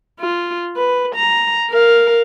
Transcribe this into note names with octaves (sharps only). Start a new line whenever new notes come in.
F4
B4
A#5
A#4 F5